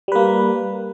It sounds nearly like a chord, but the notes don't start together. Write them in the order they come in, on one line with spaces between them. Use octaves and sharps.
G3 B4 A#3